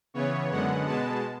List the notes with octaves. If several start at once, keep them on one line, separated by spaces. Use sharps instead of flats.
C#3 E3 B3 C#5
F#2 D3 G#3 B3 F#5
B2 G#3 B3 A5